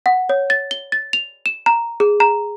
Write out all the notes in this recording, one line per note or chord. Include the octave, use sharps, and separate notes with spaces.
F#5
C#5
A6
G7
A6
F7
E7
A#5
G#4
A#5